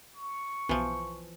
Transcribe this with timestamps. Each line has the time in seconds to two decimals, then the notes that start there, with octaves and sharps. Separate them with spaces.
0.16 C#6
0.69 B1 E3 F3